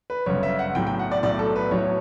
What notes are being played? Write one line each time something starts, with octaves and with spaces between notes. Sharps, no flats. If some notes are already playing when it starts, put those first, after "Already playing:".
B4
G1 F#2 C#3 C#5
E5
F#5
B1 A2 F#3 G5
G5
F#5
D5
B1 A2 F#3 D5
A4
B4
B1 A2 F#3 C#5